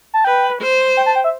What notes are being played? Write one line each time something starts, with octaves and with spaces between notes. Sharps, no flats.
A5
B4 G5
C5
G5
A5
G5
E5